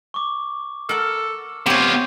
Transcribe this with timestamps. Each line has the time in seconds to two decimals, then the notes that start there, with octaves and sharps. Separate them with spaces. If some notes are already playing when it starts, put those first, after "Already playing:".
0.14 C#6 D6
0.89 A4 A#4 F#5
1.66 B2 C4 F4 G4 C#5 G6 D#7 F#7